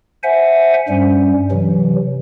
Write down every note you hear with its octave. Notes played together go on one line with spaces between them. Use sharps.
C5 E5 F#5 G#5
G2 G3 C#4
C3 E3 F#3